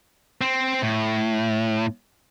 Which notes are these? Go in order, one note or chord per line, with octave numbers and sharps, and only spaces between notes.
C4
A2